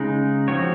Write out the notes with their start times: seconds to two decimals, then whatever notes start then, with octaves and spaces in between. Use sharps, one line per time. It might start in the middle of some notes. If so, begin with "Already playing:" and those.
Already playing: C#3 G#3 D#4
0.48 F3 C4 F#4 C#5